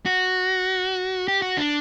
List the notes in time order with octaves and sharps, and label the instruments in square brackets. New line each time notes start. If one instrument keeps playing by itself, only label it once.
[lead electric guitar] F#4
G4
F#4
D4